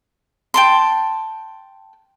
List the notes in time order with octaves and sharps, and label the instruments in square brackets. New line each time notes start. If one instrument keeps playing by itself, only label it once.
[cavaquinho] G5 A5 C6